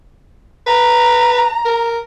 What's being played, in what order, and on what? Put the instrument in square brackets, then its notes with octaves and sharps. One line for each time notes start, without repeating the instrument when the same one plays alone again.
[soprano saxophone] B4 [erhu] A#5
[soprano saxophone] A#4